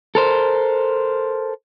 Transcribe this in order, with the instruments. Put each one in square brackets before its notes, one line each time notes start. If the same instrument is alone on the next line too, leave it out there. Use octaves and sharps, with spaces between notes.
[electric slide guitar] A4 A#4 C5